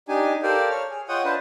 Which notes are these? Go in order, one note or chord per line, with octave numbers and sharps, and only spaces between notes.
D4 D#4 G4 G#5
G4 A4 A#4 C5 D5 F5
C#5 F6
G#4
F4 C#5 D#5 F#5 G5 D#6
D4 F4 B4 C5 A5